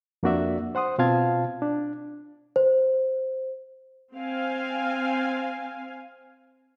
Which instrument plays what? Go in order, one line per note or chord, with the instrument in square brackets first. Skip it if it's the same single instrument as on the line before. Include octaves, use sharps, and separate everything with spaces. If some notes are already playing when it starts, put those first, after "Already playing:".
[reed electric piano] F2 A#3 D4 F#4 D5 E5
C5 F#5 C6 D#6
B2 C4 F4 F5 A5 G#6
D4
[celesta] C5
[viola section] C4 F5 G#5